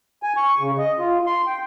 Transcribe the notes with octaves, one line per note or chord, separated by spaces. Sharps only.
G#5
C#6
C#3
D#5
F4
C6
G5